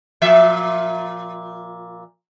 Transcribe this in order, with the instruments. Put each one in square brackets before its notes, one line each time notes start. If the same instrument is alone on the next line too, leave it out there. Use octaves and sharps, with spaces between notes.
[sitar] A#2 F3 E5